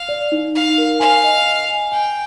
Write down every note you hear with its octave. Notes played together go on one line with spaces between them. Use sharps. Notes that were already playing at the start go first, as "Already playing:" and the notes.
Already playing: F5
D5
D#4
D#4 F5
A#4
F5 G#5
D#5
D#5
G#5
G5 G#5